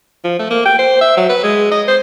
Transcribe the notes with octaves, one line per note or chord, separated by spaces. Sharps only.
F3
A3
A#3
G5
C5
E5
F#3
B4
G#3
D#5
C5